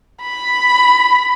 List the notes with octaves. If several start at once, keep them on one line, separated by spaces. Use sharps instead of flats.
B5